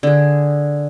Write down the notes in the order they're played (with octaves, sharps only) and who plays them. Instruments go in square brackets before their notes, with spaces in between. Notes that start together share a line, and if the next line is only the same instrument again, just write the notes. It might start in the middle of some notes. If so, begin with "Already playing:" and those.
[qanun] D3 G#4